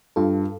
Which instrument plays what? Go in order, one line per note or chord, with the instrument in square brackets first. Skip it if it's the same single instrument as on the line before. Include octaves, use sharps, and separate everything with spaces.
[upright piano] G2 [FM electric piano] F4 A4